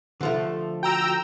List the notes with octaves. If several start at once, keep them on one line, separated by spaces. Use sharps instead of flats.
D3 F3 A3
F#4 G5 A#5 E6